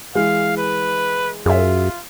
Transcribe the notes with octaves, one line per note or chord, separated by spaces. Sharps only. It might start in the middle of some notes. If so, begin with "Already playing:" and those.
E3 G#3 F5
B4
F#2 F4 G#4 E5